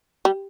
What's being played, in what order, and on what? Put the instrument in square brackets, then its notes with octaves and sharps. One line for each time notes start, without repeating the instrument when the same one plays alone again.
[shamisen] G3